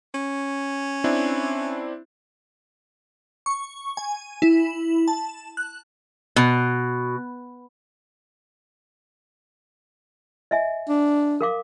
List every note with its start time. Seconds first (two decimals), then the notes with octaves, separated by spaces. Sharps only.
0.14 C#4
1.04 C4 D4 E4
3.46 C#6
3.97 G#5
4.42 E4
5.08 A5
5.57 F#6
6.36 B2
10.51 D#5 E5 G#5
10.89 D4
11.41 A#4 F5 D6